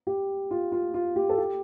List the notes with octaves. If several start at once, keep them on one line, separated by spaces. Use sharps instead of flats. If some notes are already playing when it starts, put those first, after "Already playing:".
G4
F4
F4
F4
G4
A4
G4